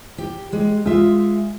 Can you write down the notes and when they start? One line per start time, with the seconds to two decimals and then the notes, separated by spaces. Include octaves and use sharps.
0.18 G4
0.52 G#3 G4
0.86 G#3 F4 E5